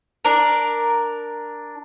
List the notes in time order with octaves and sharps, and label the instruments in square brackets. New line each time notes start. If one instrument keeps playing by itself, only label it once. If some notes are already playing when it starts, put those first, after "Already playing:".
[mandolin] D4 A#4